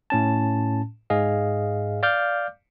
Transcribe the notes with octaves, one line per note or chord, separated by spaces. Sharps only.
A2 C#4 A5
G#2 G#4 D#5 F5
D5 F5 D6 F6 G6